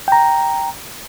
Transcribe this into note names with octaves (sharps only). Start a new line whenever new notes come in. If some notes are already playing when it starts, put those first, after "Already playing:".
G5 A#5